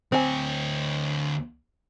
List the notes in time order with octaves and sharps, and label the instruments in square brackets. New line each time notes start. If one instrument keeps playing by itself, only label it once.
[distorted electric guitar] D2 C#5 [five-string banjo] C4 G#5